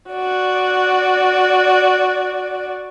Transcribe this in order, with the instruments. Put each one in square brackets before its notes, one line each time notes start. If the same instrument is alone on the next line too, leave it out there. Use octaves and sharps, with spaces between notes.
[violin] F#4 D5